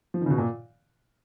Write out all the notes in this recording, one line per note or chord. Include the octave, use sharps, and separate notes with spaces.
F3
D#3
C#3
B2
A#2